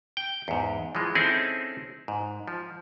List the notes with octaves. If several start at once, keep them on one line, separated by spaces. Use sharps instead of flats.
G5
E2 G#2
E3 F3 G#3
C4 C#4 D#4 E4 G#4 A4
G#2
F3